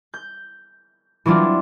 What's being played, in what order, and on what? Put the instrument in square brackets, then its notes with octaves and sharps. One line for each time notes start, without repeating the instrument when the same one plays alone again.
[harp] G6
E3 F#3 C4 D4 F4